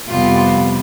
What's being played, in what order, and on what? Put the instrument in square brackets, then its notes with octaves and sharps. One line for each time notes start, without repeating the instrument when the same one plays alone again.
[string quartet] F2 C3 G3 B3 F4